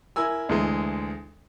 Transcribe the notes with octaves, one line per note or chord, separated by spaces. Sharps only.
E4 A#4 G#5 E6
D2 E3 G#3